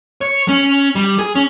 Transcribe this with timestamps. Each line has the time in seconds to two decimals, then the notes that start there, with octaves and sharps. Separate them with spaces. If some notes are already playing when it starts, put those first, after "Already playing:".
0.21 C#5
0.48 C#4
0.95 G3
1.19 G#4
1.35 C#4